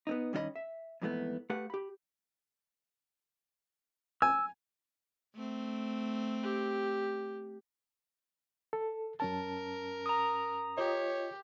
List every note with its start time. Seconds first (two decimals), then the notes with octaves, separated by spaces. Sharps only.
0.07 B3 C4 D#4
0.33 G2 D#3 C#4 F4 D#5 B5
0.56 E5
1.02 F2 G#2 E3 A3 B3
1.50 A3 G4 B4 F5 F#5
1.70 G4 B5
4.22 G#5 E6
5.35 A3 C4
6.43 G4
8.73 A4
9.20 F#2 C#4 A#4 A5
10.06 A#5 D#6
10.77 F4 G4 C#5 D#5